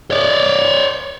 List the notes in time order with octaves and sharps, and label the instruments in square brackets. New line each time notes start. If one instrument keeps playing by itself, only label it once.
[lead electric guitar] C#5 D5